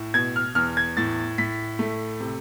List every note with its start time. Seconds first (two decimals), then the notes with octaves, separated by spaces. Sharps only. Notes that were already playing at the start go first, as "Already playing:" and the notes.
Already playing: A2
0.14 B2 G#6
0.36 F6
0.55 E2 F6
0.77 G#6
0.97 A2 A6
1.38 A2 B6
1.79 A3
2.20 C3